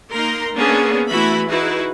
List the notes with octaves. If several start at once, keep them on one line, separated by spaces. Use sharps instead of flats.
A#3 D#4 A#4 A#5 C6
A#3 B3 C#4 D4 G#4
E3 A3 E4 F#4 E5 B5
D#4 E4 F#4 G#4 B4